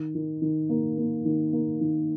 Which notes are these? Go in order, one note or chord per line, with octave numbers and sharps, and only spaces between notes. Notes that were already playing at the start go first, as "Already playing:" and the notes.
Already playing: D#3
D#3
D#3
A#3
A#3
D#3
A#3
D#3